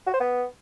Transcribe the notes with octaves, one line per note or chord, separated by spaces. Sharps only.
F#4
C5
B3